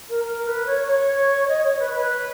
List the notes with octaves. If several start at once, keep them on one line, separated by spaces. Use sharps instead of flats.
A#4
A#4
B4
C#5
C#5
D#5
C#5
B4
B4